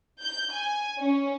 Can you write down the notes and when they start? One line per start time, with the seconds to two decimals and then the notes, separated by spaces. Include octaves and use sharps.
0.22 G6
0.52 G#5
0.99 C#4